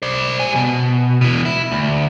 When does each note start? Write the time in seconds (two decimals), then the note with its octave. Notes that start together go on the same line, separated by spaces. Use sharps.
0.03 C5 D5
0.40 G3 G#5
0.56 B2
1.21 B2 E3
1.45 E4
1.71 D2